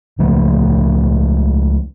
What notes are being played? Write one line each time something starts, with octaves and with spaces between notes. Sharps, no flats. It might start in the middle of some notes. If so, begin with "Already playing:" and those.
C#2 C#3 F3 A3